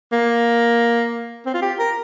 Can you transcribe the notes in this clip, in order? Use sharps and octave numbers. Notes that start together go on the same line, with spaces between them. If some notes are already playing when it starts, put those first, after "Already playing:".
A#3
C4
F4
G4
A#4